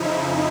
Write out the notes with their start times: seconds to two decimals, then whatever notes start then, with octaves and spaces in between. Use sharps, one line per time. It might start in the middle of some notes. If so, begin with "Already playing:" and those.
Already playing: F2 C#3 F3 D#4 E4